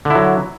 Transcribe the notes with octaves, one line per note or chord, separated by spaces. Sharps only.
D3 F#3 E4